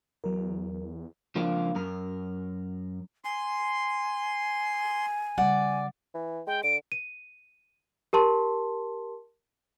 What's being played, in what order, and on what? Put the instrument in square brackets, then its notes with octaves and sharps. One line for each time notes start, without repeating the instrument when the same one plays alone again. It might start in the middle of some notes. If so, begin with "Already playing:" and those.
[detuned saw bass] E2 [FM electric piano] F#3 A#4
[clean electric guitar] C#2 F3 A#3 C4 D4 F5
F#2 A#4
[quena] G#5 [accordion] C6
[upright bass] C#3 G3 [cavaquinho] D5 F#5
[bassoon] E3
[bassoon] G#3 [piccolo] G5
[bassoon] D3 [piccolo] D7
[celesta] D#7
G4 A#4 A5 C6